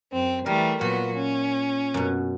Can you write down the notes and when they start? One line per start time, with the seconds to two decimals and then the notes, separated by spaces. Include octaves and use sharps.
0.13 F#2 C4
0.46 E3 G3 A3 A#4
0.81 A#2 F#3 B3 F#4
1.17 C#4
1.94 F#2 B2